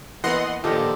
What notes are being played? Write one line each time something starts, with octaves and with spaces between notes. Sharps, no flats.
E3 A#3 B3 D#5 F#5 C6
A#2 D3 D#3 F3 G4 A4 D#5